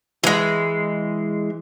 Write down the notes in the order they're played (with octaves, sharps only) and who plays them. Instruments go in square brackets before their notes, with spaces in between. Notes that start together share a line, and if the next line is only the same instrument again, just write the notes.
[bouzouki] E3 G#3